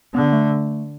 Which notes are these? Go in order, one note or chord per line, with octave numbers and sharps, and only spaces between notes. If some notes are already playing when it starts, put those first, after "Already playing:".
D3 B3
A3